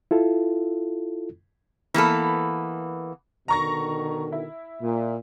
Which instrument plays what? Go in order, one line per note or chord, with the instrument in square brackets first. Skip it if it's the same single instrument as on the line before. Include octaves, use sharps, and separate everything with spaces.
[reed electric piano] E4 F4 A4
[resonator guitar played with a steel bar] E3 A#3 B3 A4
[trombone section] B2 D3 D#3 [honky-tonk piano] A#5 C#6 A#6
[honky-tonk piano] E4
[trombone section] A#2